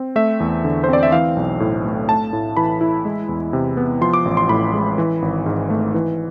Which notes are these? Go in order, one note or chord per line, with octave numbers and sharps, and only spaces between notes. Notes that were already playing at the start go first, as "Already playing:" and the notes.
Already playing: C4
A3 E5
E2
D3
C5
C4 D5
E5
E3 F5
B1
A2
A3
A3 A5
A2
E3 B5
E4
G#3
E2
C3
B3
F3 C6
D6
A1
C6
A2 B5
G#3
E3
G#1
G#2
A3
E3